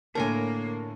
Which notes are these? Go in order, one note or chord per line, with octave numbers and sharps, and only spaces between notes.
A2 D3 A#3 A#4 C#5 G#5 A5